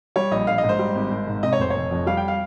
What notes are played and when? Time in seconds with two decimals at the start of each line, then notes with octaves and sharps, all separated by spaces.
0.16 G3 C#5
0.31 A#1 D#5
0.47 A#1 F5
0.58 D#5
0.64 G#2
0.69 C5
0.79 G3
0.95 G#1
1.11 G#1
1.27 G#2
1.43 C3 D#5
1.53 C#5
1.59 F1 C5
1.70 F1 C#5
1.91 F2
2.06 G3 F5
2.17 G5
2.28 F5